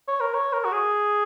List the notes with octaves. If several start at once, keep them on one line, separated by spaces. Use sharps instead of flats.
C#5
A#4
C#5
A#4
F#4
G#4